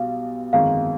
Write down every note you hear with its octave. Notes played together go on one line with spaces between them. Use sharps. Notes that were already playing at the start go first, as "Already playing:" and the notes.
Already playing: B1 B2 G3 F5
G1 F2 D#3 G#3 F5